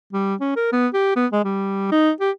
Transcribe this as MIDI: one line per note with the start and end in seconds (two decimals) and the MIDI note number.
0.13 0.35 55
0.40 0.55 61
0.56 0.68 70
0.73 0.88 59
0.94 1.13 67
1.16 1.26 59
1.32 1.41 56
1.44 1.91 55
1.92 2.11 63
2.20 2.31 67